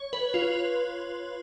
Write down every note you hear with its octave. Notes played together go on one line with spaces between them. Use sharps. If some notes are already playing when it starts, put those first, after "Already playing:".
Already playing: C#5
B4
F4